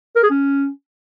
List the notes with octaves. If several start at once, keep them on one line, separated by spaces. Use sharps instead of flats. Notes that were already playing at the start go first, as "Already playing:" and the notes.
A#4
G#4
C#4